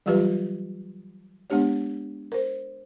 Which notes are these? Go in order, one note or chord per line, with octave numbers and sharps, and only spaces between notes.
E3 F#3 G3 F4 G4 B4
G#3 B3 D4 G4 C#5
A#4 C5